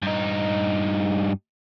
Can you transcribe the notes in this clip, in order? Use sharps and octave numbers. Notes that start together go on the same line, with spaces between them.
G2 D#4